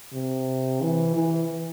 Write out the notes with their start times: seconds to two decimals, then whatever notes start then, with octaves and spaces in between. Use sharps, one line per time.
0.13 C3
0.82 E3
1.16 E3